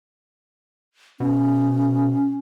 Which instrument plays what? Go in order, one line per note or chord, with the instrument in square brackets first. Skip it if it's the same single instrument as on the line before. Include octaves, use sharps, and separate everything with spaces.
[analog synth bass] B2 [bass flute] C#4